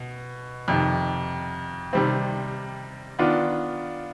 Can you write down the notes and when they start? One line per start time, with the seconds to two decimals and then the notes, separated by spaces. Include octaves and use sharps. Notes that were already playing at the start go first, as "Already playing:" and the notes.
Already playing: B2
0.68 F2 C3 D#3
1.93 C3 D#3 G3 C4
3.19 D#3 B3 D4 F4